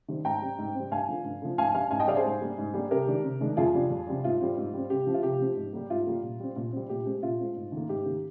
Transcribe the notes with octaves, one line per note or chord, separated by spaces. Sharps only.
D#3 G3 C4
G#2 G5 A#5
G3 C4
G#2
G3 C4
G2 F5 G#5
D3 F3
G2
D3 F3
G#2 F5 G#5
G3 D4 F5 G#5
G#2 F5 G#5
D#5 G5
G3 D4 D5 F5
G#4 C5
G#2
G3 A#3 D4
G#2
G3 A#3 D4
C3 G4 A#4
D#3 G#3 D4
C3
D#3 G#3 D4
F2 F4 G#4
C3 G3 D4
F2
C3 G3 D4
G#2 F4
G3 C4
G#2
G3 C4
C3 G4
F3 C4
F4
C3 G4
F3 C4
G#2
G3 A#3
G#2 F4
G3 A#3
A#2
G3 C4
A#2
G3 C4
A#2 G4
G#3 C4
A#2 F4
G#3 C4
G#2
D#3 A#3
G#2 G4
D#3 A#3